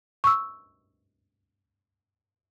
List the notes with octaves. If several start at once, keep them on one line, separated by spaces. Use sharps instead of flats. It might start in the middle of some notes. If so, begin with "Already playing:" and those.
C#6 E6